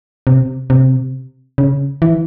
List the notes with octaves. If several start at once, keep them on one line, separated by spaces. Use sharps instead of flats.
C3
C3
C#3
E3